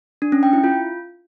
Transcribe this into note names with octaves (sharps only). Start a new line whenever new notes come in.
D4
C#4
G5
E4
F4